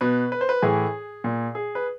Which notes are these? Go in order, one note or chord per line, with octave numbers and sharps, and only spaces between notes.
B2 B4
B4
C5
B4
A2 E3 G#4
A#2
G#4
B4